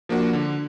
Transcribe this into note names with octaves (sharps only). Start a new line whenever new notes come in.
F3 A#3 D4 F#4
D3